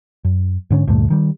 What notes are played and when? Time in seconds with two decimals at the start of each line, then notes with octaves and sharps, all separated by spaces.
0.24 F#2
0.70 G#2 D3 C#4
0.87 D2 G2 A#2 A3
1.10 D#3 G3